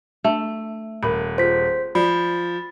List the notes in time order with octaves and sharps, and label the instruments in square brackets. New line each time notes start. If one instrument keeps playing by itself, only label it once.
[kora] A3 [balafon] D4
[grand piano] D#1 [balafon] A#4 B5
[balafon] F4 G#4 [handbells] C5 B6
[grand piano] F3 [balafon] D5 [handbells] B5